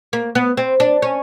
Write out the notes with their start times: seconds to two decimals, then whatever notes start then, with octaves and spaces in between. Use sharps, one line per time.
0.13 A#3
0.35 B3
0.57 C4
0.80 D4
1.02 C#4